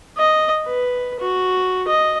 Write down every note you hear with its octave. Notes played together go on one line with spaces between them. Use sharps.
D#5
B4
F#4
D#5